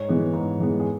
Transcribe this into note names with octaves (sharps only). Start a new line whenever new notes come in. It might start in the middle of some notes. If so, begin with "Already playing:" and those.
Already playing: G#2 C#5
E3 G#3 B3
G#2
E3 G#3 B3
G#4